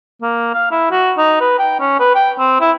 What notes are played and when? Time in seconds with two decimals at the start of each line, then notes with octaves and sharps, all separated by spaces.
0.22 A#3
0.54 F5
0.71 E4
0.91 F#4
1.18 D#4
1.40 B4
1.59 G5
1.80 C#4
1.99 B4
2.15 G5
2.39 C4
2.61 E4